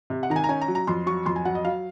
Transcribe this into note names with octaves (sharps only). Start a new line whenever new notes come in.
C3
F#5
D#3 A#5
G#5
A#5
C#4 G#5
A#5
F#3
A#5
F2 C6
F#3 C#6
F2 C6
G#5
F#3 F#5
D#5
F#3 F5